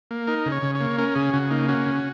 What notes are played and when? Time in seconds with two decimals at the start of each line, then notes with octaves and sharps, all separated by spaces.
0.11 A#3
0.27 D#4 A#4
0.46 C#3
0.52 C#5
0.63 C#3
0.75 C#5
0.81 A#3
0.98 C#4 A#4
1.15 C#3 G#4
1.33 C#3 F#4
1.50 A#3 D#4
1.68 C#4 F#4
1.86 C#3